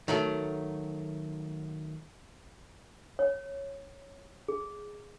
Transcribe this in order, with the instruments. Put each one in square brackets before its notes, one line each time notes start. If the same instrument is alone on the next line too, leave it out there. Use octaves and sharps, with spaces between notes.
[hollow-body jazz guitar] D#3 F#3 A3
[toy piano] C#5
G#4